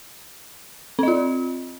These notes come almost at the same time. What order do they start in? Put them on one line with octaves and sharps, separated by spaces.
C4 D#5 F4